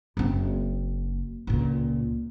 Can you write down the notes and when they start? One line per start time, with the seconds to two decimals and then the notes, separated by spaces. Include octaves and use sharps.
0.17 F#1 C4
1.47 C#2 A#2